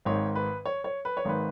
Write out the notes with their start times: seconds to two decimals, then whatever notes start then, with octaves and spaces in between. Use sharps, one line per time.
0.05 G#1 G#2 D#3 C#5
0.36 B4
0.65 C#5
0.84 C#5
1.05 B4
1.17 C#5
1.25 G#1 G#2 D#3 B4